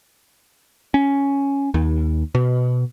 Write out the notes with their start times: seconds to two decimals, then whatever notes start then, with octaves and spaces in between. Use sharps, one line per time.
0.94 C#4
1.74 D#2
2.35 B2